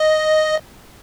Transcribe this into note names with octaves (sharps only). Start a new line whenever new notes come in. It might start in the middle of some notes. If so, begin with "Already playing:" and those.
Already playing: D#5